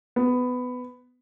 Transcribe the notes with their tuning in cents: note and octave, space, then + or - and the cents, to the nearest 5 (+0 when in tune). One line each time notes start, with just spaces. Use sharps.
B3 +15